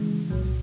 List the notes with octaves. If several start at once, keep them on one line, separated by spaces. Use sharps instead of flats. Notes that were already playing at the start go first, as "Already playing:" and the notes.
Already playing: C#3 E3 G#3
C2 A#2 F#3